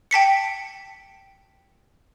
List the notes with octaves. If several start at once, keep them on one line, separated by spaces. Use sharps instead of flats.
G5 A5 B6 C#7